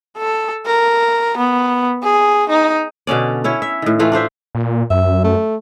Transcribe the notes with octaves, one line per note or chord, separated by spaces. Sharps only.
A4
A#4
B3
G#4
D#4
B2 D3 C#4 D5
C#4 E4 C#5
E5
A2 D#3
E3 A3 F4
D4 F4 C5 E5
A#2
F#2 E5
A3